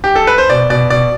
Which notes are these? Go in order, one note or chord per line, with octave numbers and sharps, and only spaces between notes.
G4
A4
B4
C5
B2 D5
B2 D5
B2 D5